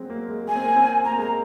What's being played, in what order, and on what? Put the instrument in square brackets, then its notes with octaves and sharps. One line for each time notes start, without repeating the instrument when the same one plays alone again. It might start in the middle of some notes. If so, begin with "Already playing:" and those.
Already playing: [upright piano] F#3 G#3 C4
A#3
G#3
[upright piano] A#3 [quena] G#5
[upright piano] C4
A#3
C4
[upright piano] A#3 [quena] A#5
[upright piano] G#3 [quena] A#5